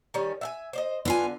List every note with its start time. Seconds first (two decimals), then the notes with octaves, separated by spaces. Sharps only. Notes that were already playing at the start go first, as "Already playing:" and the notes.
0.14 D#3 G3 C#4
0.41 E5 F#5 G#5
0.73 C5 D5 D#5
1.05 D3 B3 F4 G#5